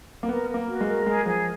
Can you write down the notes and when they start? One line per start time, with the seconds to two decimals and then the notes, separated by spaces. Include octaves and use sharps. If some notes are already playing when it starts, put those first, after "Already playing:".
0.23 A#3
0.28 B3 A#4
0.48 A#4
0.54 A#3
0.67 F#4
0.81 G#3
0.87 A#4
1.06 G#3 G#4
1.26 F3 G#4